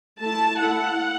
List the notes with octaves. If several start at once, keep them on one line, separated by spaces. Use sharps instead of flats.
A3 E4 A5
A3 E4 F#5